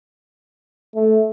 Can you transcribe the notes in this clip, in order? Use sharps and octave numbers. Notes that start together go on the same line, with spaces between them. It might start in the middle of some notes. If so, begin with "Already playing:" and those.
A3